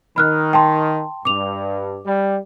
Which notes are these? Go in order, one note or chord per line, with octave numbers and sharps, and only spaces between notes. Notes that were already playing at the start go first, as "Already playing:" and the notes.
D#3 B5 F6 F#6
G5 A5 C6
G2 D6 F7
G3